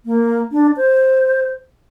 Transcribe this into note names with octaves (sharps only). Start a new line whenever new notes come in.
A#3
D4
C5